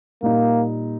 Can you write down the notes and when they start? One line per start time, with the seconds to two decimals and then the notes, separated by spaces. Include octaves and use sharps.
0.22 A#2 G3 A#3 D#4